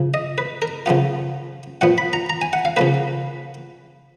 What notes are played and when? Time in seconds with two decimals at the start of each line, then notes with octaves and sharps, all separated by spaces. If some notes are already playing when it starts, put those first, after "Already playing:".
Already playing: C#3 F3
0.14 D#5
0.38 B4
0.62 A#4
0.86 C#3 F3 B3 F4
1.81 A#2 F3 B3 F#5
1.98 B5
2.13 A#5
2.30 A#5
2.42 G#5
2.53 F#5
2.65 F5
2.77 C#3 F3 A#3 B4